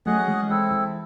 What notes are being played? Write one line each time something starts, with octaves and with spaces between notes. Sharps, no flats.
F#3 A3 C#4 G#4 D#5 F#5
E3 G#3
E3 C4 E4 A4
E3